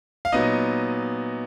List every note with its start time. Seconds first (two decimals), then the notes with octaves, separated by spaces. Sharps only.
0.25 F5
0.32 A#2 F#3 B3 D#4 D#5